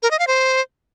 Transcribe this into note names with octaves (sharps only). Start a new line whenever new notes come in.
A#4
D#5
F5
C5